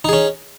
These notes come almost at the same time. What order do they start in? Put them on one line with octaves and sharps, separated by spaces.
D#4 G#4 C#4